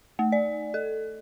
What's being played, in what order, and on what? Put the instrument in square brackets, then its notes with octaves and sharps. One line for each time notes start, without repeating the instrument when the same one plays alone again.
[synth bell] A3
D5
A4